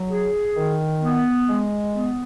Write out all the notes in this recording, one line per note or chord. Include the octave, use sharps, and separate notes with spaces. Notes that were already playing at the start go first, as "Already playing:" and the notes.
Already playing: F#3
G#4
D#3
B3
G#3
B3